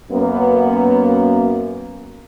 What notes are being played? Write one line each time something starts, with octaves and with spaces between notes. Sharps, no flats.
F#2 A#3 B3